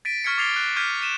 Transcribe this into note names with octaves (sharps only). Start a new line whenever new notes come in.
A6 B6 D7 D#7
C#6 F6 G#6 B6 C#7
D6 G#6 A6 C7 F7 G7
F#6
D6 F6 G6 G#6 B6 D#7
B6 C#7 D#7 E7